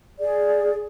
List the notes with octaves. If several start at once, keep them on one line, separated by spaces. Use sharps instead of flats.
G#4 D5